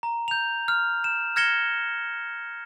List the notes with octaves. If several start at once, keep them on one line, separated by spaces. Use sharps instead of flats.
A#5
G6 F7
F6
E7
F6 G#6 A#6 C#7 E7 G7